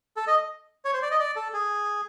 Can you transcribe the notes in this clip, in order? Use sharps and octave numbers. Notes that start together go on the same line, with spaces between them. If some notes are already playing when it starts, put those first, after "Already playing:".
A4
D#5
C#5
C5
D5
D#5
D5
A4
G#4